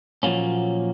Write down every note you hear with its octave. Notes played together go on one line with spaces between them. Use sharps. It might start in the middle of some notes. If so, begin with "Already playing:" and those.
A#2 F3 F#3 A#3 C#4